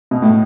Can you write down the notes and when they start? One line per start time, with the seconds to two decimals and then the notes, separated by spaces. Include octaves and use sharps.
0.11 B2
0.22 A2